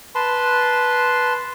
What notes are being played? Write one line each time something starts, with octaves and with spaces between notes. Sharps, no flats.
B4 A5 C6